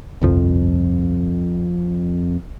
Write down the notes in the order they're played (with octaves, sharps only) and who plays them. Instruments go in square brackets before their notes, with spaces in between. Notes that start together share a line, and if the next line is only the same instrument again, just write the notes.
[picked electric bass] G1 C2 F3 [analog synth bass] F2